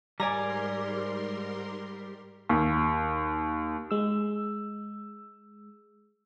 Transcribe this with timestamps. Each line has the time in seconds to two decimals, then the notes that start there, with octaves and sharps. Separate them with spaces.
0.20 G#2 G3 A#4 D5 G#5 A#5 C6
2.49 D#2
3.91 G#3 E6